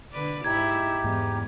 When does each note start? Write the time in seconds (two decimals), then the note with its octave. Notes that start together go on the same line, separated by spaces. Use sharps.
0.12 D3 B4 D5
0.44 G#2 D#4 E4 G4 G#6
1.04 E2 G#2